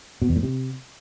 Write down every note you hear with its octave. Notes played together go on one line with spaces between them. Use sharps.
B2
E2
A2
C3